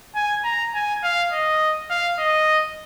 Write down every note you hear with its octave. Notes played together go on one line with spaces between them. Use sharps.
G#5
A#5
G#5
F5
D#5
F5
D#5